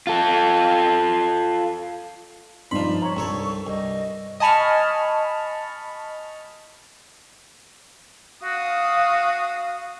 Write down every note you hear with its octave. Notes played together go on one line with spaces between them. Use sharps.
F4 A4
G2 F3 D#4 D5 B5 C6
C#5 A#5
C2 G2 A4 C#5 C#6
C2 D#5
D#5 G#5 A5 B5 C#6 F6
F#4 F5 D#6